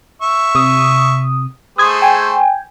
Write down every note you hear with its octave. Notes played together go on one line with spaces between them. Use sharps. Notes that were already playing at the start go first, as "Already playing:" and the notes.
E5 C#6
C3 D#6
A3 G#4 C5 D#6 G#6
G5 G#5